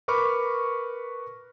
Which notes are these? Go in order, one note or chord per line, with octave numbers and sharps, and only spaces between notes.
A#4 B4 B5 C#6 D6 F6